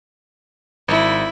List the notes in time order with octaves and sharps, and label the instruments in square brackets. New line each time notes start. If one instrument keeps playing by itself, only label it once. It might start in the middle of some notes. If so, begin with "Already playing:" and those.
[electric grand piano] G#1 [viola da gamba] E4